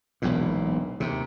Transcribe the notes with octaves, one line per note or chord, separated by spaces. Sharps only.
E1 B1 E2 A#2
D#2 C3